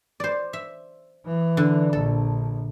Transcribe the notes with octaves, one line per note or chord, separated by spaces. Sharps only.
C5 D5
E5
E3
D3
A#1 A4